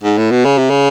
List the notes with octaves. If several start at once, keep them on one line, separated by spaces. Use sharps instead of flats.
G#2
A2
B2
C#3
C3
C#3